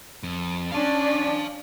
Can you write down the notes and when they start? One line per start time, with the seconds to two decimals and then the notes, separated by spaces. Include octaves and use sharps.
0.23 F2
0.72 C#4 D4 D5 F5 A5